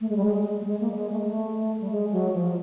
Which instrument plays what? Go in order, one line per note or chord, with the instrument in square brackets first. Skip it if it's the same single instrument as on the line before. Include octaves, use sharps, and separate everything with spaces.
[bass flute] A3
G#3
G3
G#3
A3
G#3
A#3
G3
G#3
A3
A#3
A3
G3
G#3
F#3
F3